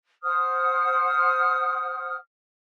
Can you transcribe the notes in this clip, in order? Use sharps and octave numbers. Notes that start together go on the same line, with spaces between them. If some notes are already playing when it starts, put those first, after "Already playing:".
C5 F#5 D#6 F6